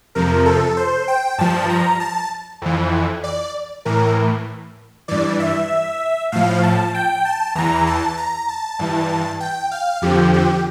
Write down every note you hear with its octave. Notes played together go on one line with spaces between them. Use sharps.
F2 C3 F3 A#4
A4
C5
G5
G2 F3 A5
A#5
A5
F2 E3
D5
A2 E3 A#4
G2 E3 D5
E5
A2 F3 F5
A5
G5
A5
E2 E3 A#5
A5
A#5
A5
G2 E3
G5
F5
F2 D3 F3 G4
G4